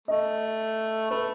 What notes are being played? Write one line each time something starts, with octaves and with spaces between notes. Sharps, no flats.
A3 D#5
A3 B4